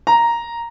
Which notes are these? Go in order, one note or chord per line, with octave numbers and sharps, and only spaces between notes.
A#5